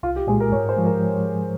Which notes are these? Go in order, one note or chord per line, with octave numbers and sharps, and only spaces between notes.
C2 F4
G4
A#2 G#3 G#4
A#4
G#2 C#5
C5
F3 G#3
A#4